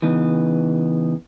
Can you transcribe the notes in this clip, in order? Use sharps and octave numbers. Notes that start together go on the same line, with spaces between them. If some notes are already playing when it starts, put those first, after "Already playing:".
C#3 E3 B3 D#4